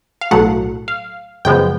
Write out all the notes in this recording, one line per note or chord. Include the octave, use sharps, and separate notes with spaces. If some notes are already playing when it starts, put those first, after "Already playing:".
F5
B1 A2 F#3 A3 F#5
F5
F#2 C#3 F3 G#3 B3 G5